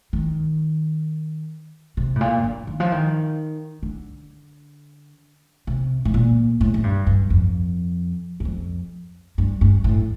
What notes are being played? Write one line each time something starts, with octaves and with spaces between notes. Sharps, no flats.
D#3
C3
A2
A#2
D3
D#3
F3
D#3
D3
C3
A2
A#2
A2
A2
G2
G2
F2
G2
F2
G2
G2
A2